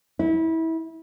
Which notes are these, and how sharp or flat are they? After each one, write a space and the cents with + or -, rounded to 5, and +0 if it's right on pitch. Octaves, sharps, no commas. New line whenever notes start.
E4 -25